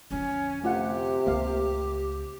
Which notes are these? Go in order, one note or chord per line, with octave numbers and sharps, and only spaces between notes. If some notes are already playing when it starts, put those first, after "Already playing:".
F2 D3 C#4
C3 A3 F4 G4 F#5
C#2 A3 A#3 F5